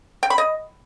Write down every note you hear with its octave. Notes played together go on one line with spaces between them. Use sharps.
G5
B5
D#5